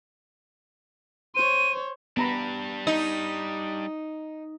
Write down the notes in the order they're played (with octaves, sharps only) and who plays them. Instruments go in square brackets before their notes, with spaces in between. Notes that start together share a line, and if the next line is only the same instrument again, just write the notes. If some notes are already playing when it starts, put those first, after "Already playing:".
[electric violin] C5 C#5 [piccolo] D#7
[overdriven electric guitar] G3 D4 [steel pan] B3 A#5 B5
[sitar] D#4 [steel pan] D#5